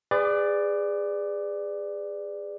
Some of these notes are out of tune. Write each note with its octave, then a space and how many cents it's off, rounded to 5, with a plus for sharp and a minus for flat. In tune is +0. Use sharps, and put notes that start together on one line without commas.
G#4 -25 B4 +30 D5 +5